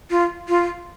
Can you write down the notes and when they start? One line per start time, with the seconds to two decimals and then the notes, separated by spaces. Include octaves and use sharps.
0.10 F4
0.48 F4